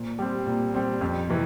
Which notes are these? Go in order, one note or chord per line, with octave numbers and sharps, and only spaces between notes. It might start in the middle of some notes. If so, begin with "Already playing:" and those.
Already playing: A#2 C5
G3 C4
A#2
G3 C4
F2
C3 E3